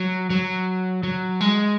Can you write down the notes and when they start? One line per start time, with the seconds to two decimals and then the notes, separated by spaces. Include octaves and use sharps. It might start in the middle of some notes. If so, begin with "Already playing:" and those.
Already playing: F#3
0.30 F#3
1.03 F#3
1.41 G#3